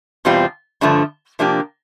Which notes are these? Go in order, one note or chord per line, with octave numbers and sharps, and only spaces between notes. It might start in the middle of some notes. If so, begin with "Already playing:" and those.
E2 B2 G3 C4 F4
G2 D3 F3 A3
C3 F3 A#3 D4 G4